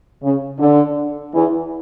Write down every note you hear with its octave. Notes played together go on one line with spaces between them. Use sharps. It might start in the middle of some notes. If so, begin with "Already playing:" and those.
C#3
D3
E2 E3